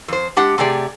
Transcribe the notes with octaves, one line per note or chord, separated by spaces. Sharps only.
F2 C5
G#3 D4 G4 F#5
C3 A3 G4 G#4 D5